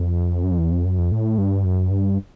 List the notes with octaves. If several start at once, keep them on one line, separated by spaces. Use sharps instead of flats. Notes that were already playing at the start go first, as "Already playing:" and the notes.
Already playing: F2
F#2
F2
E2
F2
F#2
F2
A2
G2
F#2
G2